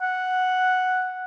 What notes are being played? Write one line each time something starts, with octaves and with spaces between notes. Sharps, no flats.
F#5